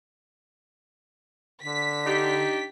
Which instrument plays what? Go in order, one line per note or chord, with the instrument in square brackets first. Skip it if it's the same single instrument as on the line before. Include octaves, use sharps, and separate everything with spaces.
[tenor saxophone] D3 [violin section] B6
[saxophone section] D4 D#4 G4